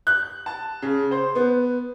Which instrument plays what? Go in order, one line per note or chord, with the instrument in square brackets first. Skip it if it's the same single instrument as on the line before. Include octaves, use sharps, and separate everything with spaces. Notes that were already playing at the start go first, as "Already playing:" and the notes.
[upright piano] F#6
A5
C#3
C5
B3